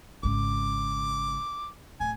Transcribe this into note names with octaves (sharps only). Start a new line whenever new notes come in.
G#1 C#3 D6
D1 G#5